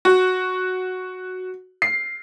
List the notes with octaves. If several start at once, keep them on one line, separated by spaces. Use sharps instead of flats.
F#4
C7